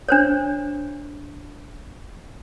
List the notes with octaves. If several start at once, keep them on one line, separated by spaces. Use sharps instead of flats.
D4 C5 C#5